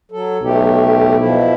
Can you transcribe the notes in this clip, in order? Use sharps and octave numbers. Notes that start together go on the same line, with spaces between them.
F#3 A4
B1 A3 G4
B2 F3 E4